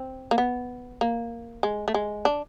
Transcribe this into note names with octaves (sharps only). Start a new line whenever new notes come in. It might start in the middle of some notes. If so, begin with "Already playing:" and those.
Already playing: C4
A#3
B3
A#3
G#3
A3
G#3
D4